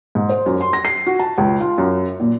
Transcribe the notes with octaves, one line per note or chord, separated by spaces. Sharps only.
G#2
C5
F#2
C6
A#6
C7
F#4
A5
C#2
F4
F#2
A#2